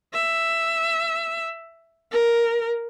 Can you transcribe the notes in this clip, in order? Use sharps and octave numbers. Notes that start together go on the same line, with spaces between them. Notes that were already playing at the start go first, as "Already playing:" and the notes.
E5
A#4